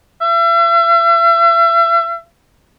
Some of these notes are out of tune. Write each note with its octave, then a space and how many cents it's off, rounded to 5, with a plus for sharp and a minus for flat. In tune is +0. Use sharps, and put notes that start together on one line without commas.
E5 +40